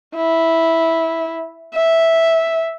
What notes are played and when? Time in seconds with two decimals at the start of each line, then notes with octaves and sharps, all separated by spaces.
0.16 E4
1.74 E5